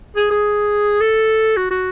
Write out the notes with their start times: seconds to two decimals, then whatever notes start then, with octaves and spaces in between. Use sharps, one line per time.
0.16 G#4
0.31 G#4
1.01 A4
1.57 F#4
1.71 F#4